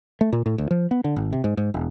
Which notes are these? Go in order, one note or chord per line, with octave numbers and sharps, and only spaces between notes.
A3
A#2
A2
D2
F3
B3
D3
G#1
C3
G#2
G#2
E1